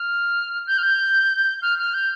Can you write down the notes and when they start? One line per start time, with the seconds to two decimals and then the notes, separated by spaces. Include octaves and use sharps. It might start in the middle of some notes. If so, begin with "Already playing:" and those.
Already playing: F6
0.67 G6
0.78 F6
0.83 G6
1.62 F6
1.79 F6
1.94 G6